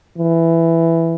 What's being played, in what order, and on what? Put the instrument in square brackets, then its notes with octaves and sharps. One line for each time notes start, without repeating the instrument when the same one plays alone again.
[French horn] E3